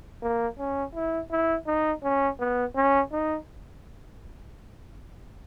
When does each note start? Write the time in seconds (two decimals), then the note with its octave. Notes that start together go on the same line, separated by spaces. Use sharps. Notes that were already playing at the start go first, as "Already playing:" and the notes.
0.22 A#3
0.59 C#4
0.95 E4
1.31 E4
1.67 D#4
2.03 C#4
2.40 B3
2.76 C#4
3.12 D#4